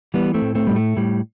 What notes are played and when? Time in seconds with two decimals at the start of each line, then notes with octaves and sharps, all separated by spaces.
0.14 E3 G3 B3
0.34 A3 C4
0.41 A2
0.55 A3 C4
0.67 A2 G3
0.76 A3
0.97 A2 G3